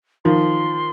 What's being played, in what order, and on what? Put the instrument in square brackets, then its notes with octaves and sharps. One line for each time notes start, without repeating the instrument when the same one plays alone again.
[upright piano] D#3 F3 [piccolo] C6